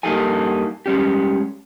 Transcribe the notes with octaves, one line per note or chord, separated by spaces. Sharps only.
G2 A#3 D#4 G4 A4 G#5
G3 G#3 C#4 G4